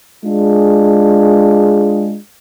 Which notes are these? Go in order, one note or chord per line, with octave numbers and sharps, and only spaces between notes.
G#3 D4 F4 G#4